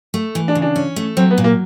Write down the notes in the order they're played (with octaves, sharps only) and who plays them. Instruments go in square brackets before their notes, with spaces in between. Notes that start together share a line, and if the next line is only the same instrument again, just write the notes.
[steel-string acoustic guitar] A3
E3
[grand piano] D4
[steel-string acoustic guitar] C#3
[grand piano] D4
[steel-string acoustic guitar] C#4
A3
[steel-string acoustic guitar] F#3 [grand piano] C4
[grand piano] B3
[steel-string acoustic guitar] A#2
[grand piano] A#3